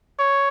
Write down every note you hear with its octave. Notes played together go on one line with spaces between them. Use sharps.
C#5